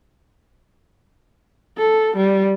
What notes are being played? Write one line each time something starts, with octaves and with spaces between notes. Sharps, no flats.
A4
G3